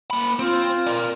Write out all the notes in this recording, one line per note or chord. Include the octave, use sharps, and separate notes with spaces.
A#3 B5
C4 F4
A#4 D5